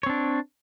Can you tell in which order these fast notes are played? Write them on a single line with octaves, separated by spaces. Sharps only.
C#5 C4 D4